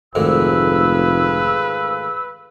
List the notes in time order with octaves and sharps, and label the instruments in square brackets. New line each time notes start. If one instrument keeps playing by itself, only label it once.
[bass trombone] F1 [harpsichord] D2 G#2 D#3 [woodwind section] G#4 F5 E6 [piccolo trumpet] B4